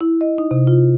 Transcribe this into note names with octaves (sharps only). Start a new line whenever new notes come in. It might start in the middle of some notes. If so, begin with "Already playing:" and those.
E4
D#5
D#4
C3
F4